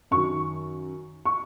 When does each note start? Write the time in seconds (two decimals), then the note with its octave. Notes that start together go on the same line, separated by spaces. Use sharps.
0.11 F#2 D#3 C#6
1.25 C#6